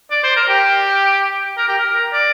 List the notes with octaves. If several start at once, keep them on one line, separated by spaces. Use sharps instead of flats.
D5
C5
A#4
G4
A#4
G4
A#4
D5